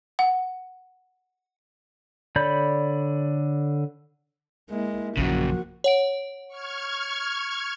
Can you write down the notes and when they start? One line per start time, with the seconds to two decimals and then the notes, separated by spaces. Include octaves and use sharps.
0.19 F#5
2.36 D3 C#5 D5 B5 G6
4.70 G#3 A#3 E4
5.17 A#1 F#2 C#3 E3 F3 A#3 F#4
5.84 C#5 F#5 D7
6.48 C#6 F6 G#6